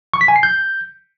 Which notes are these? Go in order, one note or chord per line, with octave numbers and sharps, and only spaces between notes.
C#6
B6
G#5
C7
G6